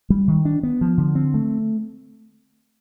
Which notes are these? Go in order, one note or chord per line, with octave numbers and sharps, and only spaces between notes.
G3
D#3
D4
B3
F3
D3
C4
A3